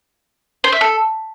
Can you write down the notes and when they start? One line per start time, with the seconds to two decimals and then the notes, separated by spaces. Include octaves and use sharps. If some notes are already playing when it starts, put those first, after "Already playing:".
0.64 C5
0.72 E5
0.81 A4